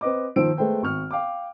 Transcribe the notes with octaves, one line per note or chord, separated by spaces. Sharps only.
C4 B4 D#5 D6
D#3 F3 C5 E6 D7
G#3 A3 B4 C5 G5
G#1 C#6 F6
F5 G5 D6